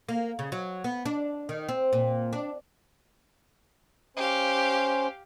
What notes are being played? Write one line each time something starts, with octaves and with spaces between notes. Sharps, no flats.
A#3
C#3
F#3
B3
D4
D#3
C4
A#2
D4
C#4 G4 C5 F5